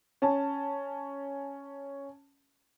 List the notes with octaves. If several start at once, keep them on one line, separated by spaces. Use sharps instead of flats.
C#4 A5